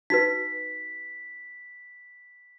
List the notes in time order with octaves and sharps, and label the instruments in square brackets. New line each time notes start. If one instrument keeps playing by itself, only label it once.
[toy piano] D#4 F#4 B4 [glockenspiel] B6